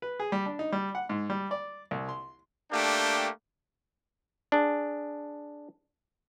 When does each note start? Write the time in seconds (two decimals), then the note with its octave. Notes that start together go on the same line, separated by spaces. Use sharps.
0.02 B4
0.20 G#4
0.32 G3
0.46 D4
0.59 D#4
0.72 G3
0.95 F#5
1.09 G#2
1.30 G3
1.51 D5
1.91 C2
2.09 C6
2.72 A3 A#3 D4 G4 G5
4.52 D4 G#4